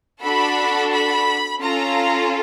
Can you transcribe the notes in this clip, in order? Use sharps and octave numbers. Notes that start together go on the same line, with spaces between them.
D4 F#4 A4 B5
B5
C#4 F4 A4 A#5